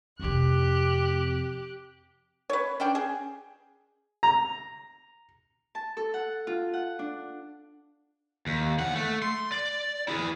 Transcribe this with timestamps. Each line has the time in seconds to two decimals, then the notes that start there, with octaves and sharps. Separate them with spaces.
0.20 F2 C3 G4 F#6
2.50 B4 C#5
2.80 C#4 D4 G5
2.95 G#4
4.23 A#5
5.75 A5
5.97 A4
6.14 F#5
6.47 F4
6.73 F#5
6.99 D4
8.46 D#2
8.78 E2 F#5
8.95 A3
9.22 C6
9.52 D5
10.08 E4 G#4